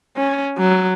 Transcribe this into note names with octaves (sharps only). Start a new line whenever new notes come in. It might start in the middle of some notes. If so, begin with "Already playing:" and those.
C#4
F#3